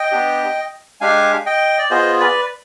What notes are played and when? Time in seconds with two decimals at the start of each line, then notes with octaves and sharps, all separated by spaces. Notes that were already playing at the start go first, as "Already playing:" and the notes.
Already playing: D#5 G5
0.12 B3 D4 G4
1.01 G#3 D4 G4 F5 G#5
1.46 D#5 G5
1.79 D5
1.91 B3 F4 G#4 C5 D#5
2.20 B4 D5